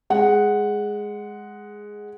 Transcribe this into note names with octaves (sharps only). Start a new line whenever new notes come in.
G#3 F#5